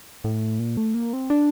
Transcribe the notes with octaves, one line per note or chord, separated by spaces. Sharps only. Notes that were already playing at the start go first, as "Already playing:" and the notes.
A2
A#2
A3
A#3
C4
D4